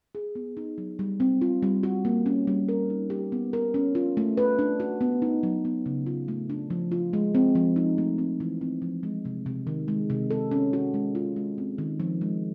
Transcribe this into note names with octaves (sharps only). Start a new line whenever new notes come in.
G#4
B3
D#4
F#3
G3
C4
F4
G3
F#4
A#3
C#4
G3
A#4
D#4
G4
B3
A#4
C#4
F4
A3
B4
D4
F#4
B3
D#4
F#3
B3
C#3
F4
A3
D4
F3
F4
G#3
C4
F3
D#4
A3
C4
E3
C4
F3
G#3
C3
C3
D#3
G#3
C3
A4
C#4
F#4
G#3
F4
G#3
C4
D#3
F3
G#3